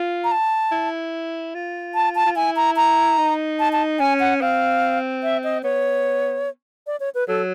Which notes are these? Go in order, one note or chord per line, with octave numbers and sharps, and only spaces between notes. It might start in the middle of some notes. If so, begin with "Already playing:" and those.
Already playing: F4
A#5
A5
E4
F4
A5
A5
F4
E4 G#5
A#5
A#5
D#4
A5
A5
C#4 G#5
F#5
C4 F5
E5
D#5
B3 C#5
D5
C#5
B4
F#3 A4